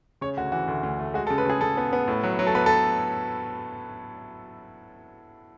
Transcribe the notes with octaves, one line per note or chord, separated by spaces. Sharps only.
C#3 C#5
D2 F#4
E3 F#4
D2
D2
A3
G#3 F#4
A4
C#3
B4
C#3 G#4
C#3 A4
B3
B3
A2
F#3
F#3
A4
B3 B4
A4